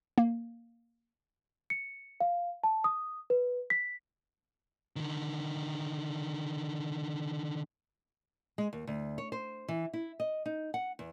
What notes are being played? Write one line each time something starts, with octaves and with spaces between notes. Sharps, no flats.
A#3
C#7
F5
A5
D#6
B4
B6
D3 D#3
G#3
D#2
D2
C#5
C5
E3
E4
D#5
D#4
F#5
E2